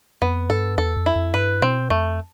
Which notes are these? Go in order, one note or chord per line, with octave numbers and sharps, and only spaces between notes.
F2 B3
G2 A4
E2 A4
F2
E4
F2
G2 B4
B2 C4
F2 A3